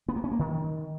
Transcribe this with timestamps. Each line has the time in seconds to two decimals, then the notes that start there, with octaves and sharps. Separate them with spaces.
0.08 B3
0.16 A#3
0.24 C#4
0.32 A#3
0.39 D#3